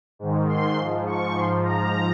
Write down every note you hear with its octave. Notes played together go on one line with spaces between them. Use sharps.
G#2 D#3
C6
G#2 F3
C#6
G#2 F3 C6
A#5